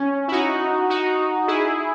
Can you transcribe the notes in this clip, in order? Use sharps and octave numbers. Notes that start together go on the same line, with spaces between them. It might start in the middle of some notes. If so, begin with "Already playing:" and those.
Already playing: C#4
E4
D#4 F#4
D#4 F#4
E4 G#4